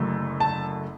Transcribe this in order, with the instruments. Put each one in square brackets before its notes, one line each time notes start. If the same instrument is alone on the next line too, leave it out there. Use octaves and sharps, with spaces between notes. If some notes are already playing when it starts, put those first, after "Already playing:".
Already playing: [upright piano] F#1 F#2 D3 A3
A5